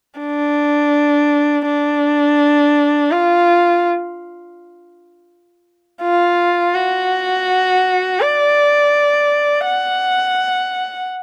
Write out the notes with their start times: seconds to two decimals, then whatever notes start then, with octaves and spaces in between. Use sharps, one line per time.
0.20 D4
1.66 D4
3.11 F4
6.02 F4
6.74 F#4
8.21 D5
9.66 F#5